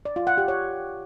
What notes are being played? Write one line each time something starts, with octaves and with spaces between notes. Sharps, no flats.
D5
F4
F#5
G4
C#5